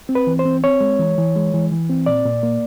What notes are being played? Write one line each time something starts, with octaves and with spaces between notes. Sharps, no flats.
C4
B4
E3
C5
C4
C4 C#5
G#3
E3
E3
G#3
E3
E3
C4
A#2 D5
A#2
A#3